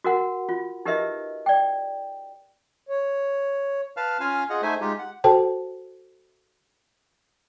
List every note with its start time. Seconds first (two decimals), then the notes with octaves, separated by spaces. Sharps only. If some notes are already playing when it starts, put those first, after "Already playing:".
0.04 F#4 A#4 F#5
0.49 F4
0.85 D#4 G4 A#4 B4 D#5 E5
1.46 D5 G5
2.89 C#5
3.97 B4 F5 A5 F6
4.20 C#4 F4 F5 G#5 F6
4.50 F4 G#4 D#5 F#5
4.62 A3 D#4 C5 E5 G#5
4.81 G#3 D#4 F4 G4
4.98 F#5
5.24 F#4 A4 C5 G5 A5